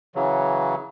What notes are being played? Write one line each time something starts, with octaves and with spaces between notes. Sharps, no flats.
C#3 E3 F#3